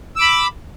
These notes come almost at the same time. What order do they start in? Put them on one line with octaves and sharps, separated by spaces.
E6 D6 B5